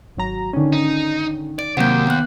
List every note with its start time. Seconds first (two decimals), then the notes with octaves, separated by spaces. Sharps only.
0.17 G#1 F#3 A#5
0.53 G#2 D3 D#3 C#4
0.73 D#4
1.59 D5 D7
1.77 D#2 C3 F#3 A#3 F#5 G6
2.07 B3 F#6